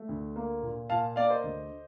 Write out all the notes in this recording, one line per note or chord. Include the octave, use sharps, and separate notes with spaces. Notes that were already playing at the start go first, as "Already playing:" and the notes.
Already playing: A3
D2
A#3
A#2
A#2 F5 A5
A#3 D5 F5
C5 D#5
D2